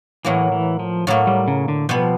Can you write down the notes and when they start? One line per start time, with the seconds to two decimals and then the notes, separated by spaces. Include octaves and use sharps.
0.24 A2 E3 F#3 A#3
0.52 E3
0.79 F3
1.07 A2 F#3 A#3
1.27 G3
1.48 C#3
1.68 D3
1.89 B2 F3 G3 B3